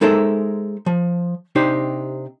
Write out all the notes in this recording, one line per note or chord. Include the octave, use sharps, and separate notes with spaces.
G#3 D#4 A4 A#4 C5 E5
F3
C3 D4 D#4 G4 C5